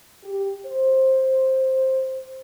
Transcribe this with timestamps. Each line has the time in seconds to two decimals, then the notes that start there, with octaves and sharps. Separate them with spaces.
0.24 G4
0.67 C5